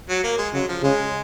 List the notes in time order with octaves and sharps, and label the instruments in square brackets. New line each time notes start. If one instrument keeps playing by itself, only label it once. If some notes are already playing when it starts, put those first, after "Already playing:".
[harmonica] F#3
A#3
G#3
[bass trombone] C#3 [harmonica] F#3
[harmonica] F3
[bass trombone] C#3 [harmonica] G#3